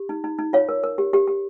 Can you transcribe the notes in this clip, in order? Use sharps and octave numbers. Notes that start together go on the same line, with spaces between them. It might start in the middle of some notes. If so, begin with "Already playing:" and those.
Already playing: G4
D#4
D#4
D#4
F4 C#5 F5
A#4
A#4
G4
G4
G4